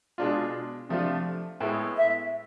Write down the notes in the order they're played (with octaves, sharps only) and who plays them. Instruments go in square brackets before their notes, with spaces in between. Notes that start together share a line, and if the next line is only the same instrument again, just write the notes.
[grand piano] B2 G#3 D4 F4
C3 F3 A3 D4 F4
A2 G#3 B3 E4
[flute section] E5